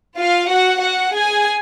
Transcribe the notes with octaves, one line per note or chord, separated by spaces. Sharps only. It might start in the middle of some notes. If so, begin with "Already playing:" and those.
F4 F5
F#4 F#5
F#4 F#5
G#4 G#5